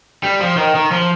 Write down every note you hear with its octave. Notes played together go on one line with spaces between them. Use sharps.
G3
F3
D#3
D#3
F3